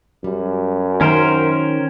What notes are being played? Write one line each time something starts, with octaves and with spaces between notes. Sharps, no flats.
F#2 G3
D#3 C#4 A#4 C5